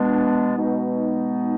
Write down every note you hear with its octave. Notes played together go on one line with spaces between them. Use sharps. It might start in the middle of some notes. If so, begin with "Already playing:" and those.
Already playing: B2 G#3 B3 D4
B2 G#3 B3 D#4